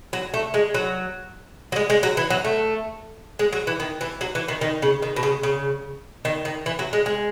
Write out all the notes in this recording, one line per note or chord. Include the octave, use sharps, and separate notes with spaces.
F#3
A3
G#3
F#3
F#3
G#3
G#3
F#3
E3
F#3
A3
G#3
F#3
E3
D#3
E3
F#3
E3
D#3
D#3
C#3
D#3
B2
C#3
C#3
D#3
D#3
E3
F#3
G#3
G#3